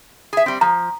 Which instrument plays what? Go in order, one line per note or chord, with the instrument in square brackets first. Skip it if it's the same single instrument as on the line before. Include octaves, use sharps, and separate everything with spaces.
[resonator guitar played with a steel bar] G#4 E5
G3 C4
[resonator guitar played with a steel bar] F3 [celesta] A#5